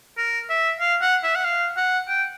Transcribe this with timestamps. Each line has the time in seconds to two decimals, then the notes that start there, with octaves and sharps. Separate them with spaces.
0.17 A#4
0.50 E5
0.80 F5
1.02 F#5
1.23 E5
1.35 F#5
1.45 F5
1.77 F#5
2.08 G5